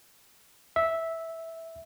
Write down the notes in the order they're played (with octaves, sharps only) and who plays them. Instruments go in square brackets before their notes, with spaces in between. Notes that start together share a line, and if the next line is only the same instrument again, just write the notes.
[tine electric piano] E5